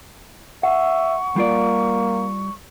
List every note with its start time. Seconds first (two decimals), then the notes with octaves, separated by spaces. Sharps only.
0.63 E5 F#5 C#6
1.36 G3 A#3 F4 D5